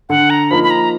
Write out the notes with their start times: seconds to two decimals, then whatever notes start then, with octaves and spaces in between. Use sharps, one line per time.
0.09 D3 F#5
0.30 A#5
0.51 F3 A#3 D#4 B5
0.63 B5
0.70 A#5